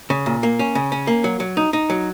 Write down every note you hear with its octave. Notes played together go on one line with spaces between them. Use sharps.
C#3
A#2
A#3
C#4
C#3
C#4
A#3
F#3
F#3
D#4
D#4
F#3